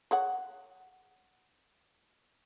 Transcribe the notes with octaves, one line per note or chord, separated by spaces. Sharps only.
G#4 C#5 F#5